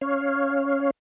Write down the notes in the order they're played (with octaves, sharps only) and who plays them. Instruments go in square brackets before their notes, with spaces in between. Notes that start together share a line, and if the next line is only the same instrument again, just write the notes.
[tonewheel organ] C#4 C#5 F5